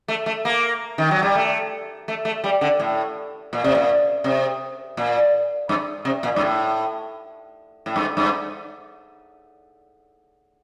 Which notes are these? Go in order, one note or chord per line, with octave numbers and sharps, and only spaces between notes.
A3
A3
A#3
D#3
F#3
G3
A3
A3
A3
G3
D3
A2
A#2
C3
A#2
C3
A#2
G2
C3
A#2
G2
A2
A2
G2
G2